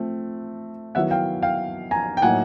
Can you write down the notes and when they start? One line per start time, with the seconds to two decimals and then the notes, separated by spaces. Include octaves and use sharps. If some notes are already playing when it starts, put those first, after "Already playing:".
Already playing: F3 A3 C4
0.95 D#3 F#3 B3 E4 E5 F#5
1.11 F5 G5
1.42 F5 G5
1.91 G#5 A#5
2.17 G5
2.22 A2 F#3 A#3 D#4 F#5 G#5